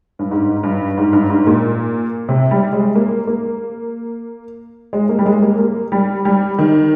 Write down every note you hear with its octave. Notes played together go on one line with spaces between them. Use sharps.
G2
G#2
G2
G#2
G2
G#2
A#2
C3
G3
G#3
A#3
A#3
G#3
A#3
G3
G#3
A#3
A#3
G3
G3
D#3